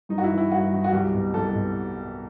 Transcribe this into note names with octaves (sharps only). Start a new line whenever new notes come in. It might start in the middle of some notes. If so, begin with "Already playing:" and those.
G2 D#4
F#4
E4
E3
E4
G2 F#4
E3
F#4
C2 G4
B2
C2 A4
B2